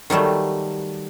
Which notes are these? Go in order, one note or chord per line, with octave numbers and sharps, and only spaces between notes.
D#3 F#3 G3 A3